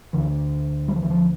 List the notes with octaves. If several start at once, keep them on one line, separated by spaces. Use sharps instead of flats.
D2 D3 E3
G3
F3
E3
F3